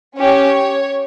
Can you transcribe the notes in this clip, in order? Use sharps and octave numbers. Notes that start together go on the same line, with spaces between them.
C#4 G4 C#5